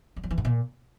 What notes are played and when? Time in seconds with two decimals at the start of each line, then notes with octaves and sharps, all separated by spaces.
0.16 G3
0.24 F#3
0.31 E3
0.38 G#2
0.45 A#2